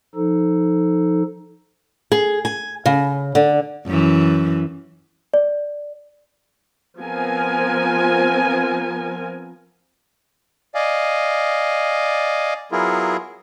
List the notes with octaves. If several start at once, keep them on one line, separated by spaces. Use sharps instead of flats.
F3 D#4 A4
G#4
G#5
C#3
D3
F#2 E3
D5
F3 B3 C4 A#4 G#5
D5 D#5 F5 G#5
F#3 B3 E4 F4 G#4 A#4